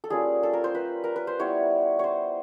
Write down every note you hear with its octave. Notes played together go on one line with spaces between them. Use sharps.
A4
G3 A#3 C#4 F4 G#4
A4
A#4
C5
B4
A#4
B4
C5
G3 B3 E4 C#5
C5 C#5